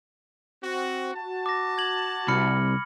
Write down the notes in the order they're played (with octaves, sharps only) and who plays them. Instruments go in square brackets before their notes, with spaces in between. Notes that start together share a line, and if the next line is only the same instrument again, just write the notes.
[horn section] C4 F#4
F#4 A5
[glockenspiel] D6 A#6
G#6 F#7
[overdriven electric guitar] C2 [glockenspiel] B5 F6 C#7